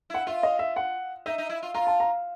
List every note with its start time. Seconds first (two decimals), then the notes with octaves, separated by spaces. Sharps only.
0.10 E4 F#5
0.27 F4 E5
0.43 D#5
0.59 E5
0.76 F#5
1.26 D#4 E5
1.38 D#4
1.49 E4
1.62 F4
1.74 F4 A#5
1.87 A5
2.00 A#5